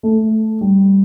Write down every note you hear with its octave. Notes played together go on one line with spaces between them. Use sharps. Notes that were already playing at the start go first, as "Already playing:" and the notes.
A3
G3